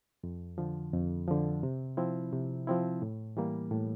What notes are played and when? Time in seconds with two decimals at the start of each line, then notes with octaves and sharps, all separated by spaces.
0.24 F2
0.58 D3 F3
0.93 F2
1.28 D3 F3
1.63 C3
1.97 F3 C4 E4
2.33 C3
2.67 F3 C4 E4
3.02 A2
3.37 E3 G3 A#3
3.71 A2